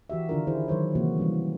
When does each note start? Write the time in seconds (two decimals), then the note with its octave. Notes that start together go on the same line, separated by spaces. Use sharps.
0.10 E3 F#4 G4 E5
0.29 D3 D#3 D4 F4 A#4
0.47 D#4 E4 G#4 C5
0.68 D#3 F#3 C5 C#5
0.95 C3 E3 A#3 F#4
1.18 E3 G3 C#4